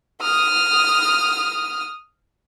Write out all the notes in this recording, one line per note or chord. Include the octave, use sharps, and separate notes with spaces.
D#6 F6